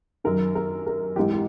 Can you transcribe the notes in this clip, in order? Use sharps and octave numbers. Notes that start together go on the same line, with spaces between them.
F#2 D#3 A#4
A#4
A#4
G#2 E3 G4
G4